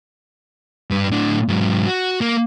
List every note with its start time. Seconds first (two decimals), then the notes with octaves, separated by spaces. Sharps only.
0.90 G2 B4
1.12 A2 D4
1.49 G#2 F#3
1.86 F#4
2.21 A#3